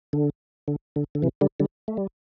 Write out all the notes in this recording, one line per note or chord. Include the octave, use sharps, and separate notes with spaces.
D3
D3
D3
D3
C3 E3
D3 G3
D3 G3
A3
G3